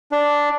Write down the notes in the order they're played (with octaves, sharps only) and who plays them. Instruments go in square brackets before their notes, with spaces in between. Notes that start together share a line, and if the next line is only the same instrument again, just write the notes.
[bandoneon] D4